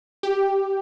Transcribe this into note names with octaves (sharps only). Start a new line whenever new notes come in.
G4